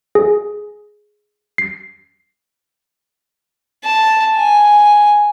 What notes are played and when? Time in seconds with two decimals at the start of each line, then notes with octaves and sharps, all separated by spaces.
0.15 G#4
1.58 C7
3.84 A5
4.36 G#5